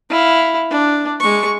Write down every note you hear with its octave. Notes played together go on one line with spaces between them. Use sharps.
E4 F5
D4
G#3 C#6